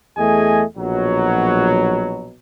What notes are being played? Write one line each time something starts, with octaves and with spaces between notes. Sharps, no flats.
E2 A3 G#4 D#5 G#5
A#1 B2 F#3